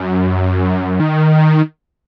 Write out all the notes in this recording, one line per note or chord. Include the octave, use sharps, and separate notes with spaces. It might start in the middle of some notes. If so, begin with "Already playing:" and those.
Already playing: F#2
D#3